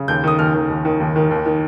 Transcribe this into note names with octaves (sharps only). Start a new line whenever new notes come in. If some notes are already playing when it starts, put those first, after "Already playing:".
Already playing: C#3
D#2 G6
D#3 D#6
D#2 F6
D#3
D#2
D#3
D#2
D#3
D#2
D#3